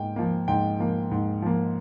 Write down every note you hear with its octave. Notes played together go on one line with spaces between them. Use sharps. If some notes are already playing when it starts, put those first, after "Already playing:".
Already playing: G#2 A#3 G5
F3 A#3
G#2 G5
F3 A#3
G#2
F3 A#3